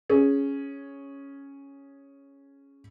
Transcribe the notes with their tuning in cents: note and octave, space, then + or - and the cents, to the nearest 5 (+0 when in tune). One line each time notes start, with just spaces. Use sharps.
C#4 +0 G#4 +0